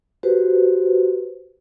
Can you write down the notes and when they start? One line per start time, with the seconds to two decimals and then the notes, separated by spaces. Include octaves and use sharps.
0.23 F#4 G4 B4 C5